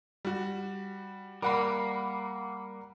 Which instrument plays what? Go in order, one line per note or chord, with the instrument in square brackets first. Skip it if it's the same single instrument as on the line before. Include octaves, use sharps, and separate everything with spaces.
[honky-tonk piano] G3 F#4
[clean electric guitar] G3 A#3 [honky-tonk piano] A#4 F#5 B5